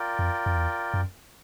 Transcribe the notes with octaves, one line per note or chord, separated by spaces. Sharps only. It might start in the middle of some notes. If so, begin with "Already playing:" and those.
Already playing: F4 A#4 D5 G5
F2
F2
E2
F#2